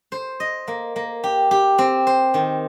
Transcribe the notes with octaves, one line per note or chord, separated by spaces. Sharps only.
C5
D#5
A#3
A#3
G4
G4
C4
C5
D#3